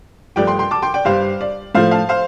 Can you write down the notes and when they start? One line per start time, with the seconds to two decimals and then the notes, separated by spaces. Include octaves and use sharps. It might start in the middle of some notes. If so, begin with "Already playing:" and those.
0.36 G2 F3 A3 D5 G5
0.47 G5 C6
0.59 G5 C6
0.71 A5 D6
0.82 G5 C6
0.94 D5 G5
1.05 G2 G3 C5 F5
1.41 D5
1.75 A2 F3 A3 C5 F5
1.91 F5 A5
2.09 C5 F5